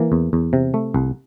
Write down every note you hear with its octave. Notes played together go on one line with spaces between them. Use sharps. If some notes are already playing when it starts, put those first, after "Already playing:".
Already playing: E3 A#3
E2
E2
C3
A3
C2